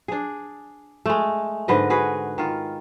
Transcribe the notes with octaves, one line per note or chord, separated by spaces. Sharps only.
D4 G#4
G#3 A3
G#2 D3 B4 D#5
F#4 G#4 B4
D#3 F4